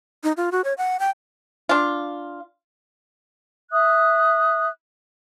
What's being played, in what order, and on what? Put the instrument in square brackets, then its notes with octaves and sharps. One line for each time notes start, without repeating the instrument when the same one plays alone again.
[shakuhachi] D#4
F4
F#4
C#5
F#5
G5
[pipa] D4 F4
[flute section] E5 D#6 F#6